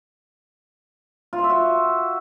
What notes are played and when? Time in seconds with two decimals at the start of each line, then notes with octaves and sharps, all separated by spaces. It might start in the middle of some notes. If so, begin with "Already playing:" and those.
1.33 F4
1.38 C5
1.44 E5
1.50 F#4